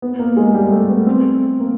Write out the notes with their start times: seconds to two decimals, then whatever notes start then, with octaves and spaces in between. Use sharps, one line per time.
0.02 B3
0.19 A#3
0.37 G#3
0.54 G3
0.72 A3
0.89 B3
1.07 C4
1.60 A#3